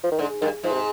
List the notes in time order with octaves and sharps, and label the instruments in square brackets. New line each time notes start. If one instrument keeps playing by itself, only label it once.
[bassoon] F3
D#3
[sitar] G#2 [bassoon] D3
[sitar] G2 [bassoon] D#3
[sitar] G#2 [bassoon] F3
[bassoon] C3